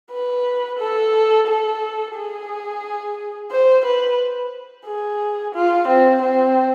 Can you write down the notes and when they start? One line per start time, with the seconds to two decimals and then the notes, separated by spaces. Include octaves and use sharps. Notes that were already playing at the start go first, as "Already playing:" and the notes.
0.11 B4
0.79 A4
1.47 A4
2.15 G#4
3.51 C5
3.85 B4
4.86 G#4
5.54 F4
5.88 C4
6.22 C4